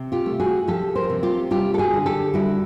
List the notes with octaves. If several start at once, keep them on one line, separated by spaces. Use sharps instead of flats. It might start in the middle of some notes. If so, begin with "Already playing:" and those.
Already playing: C3
F4 G4
A3
F#4 G#4
F3 G4 A4
A#4 C5
C3
F4 G4
G3 F4 G4
A4
F#4 G#4
D3
G4 A4
G3 E4 F#4